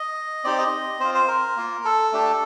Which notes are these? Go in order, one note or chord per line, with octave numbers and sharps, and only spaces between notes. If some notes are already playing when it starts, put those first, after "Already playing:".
Already playing: D#5
C4 D#4 G4 D5
D#5
C4 F4 C5
C5
A#4
A#3 F4
A4
A3 D4 G4